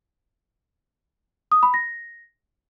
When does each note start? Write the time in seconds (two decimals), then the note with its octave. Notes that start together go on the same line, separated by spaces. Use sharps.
1.52 D#6
1.63 B5
1.74 A#6